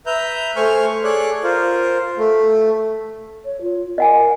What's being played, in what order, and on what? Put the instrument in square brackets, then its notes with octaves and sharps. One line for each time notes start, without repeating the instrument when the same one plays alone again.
[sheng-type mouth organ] B4 E5 A#5 G6
A3 C5 G#5 C#6 F6
G#4 A4 C#5 D5 F#6
F4 A#4 C5
A3
[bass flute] C#5
F4
[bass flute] A#4 [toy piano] D#5 F#5 G#5